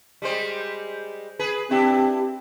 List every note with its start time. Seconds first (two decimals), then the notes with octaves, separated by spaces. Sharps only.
0.22 G3 G#3 C5
1.39 G#4 B4
1.71 C4 D4 E4 G4